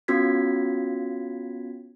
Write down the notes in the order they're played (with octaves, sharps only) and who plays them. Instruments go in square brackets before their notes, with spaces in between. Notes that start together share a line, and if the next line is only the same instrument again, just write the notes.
[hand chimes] B3 C#4 F4 F#4 G#6 B6